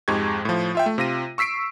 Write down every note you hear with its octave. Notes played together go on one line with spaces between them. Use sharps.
F2 G#2 G#3 G4 C#6 G#6
A2 F3
F4 E5 G5
A3
C3 F4 A#6 D#7
C#6 E6 B6 C7 D7